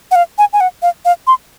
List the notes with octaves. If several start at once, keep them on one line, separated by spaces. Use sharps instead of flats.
F#5
F5
G#5
G#5
F#5
F5
F5
C6